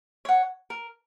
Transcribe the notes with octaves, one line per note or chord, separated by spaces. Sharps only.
C#5 F#5
A#4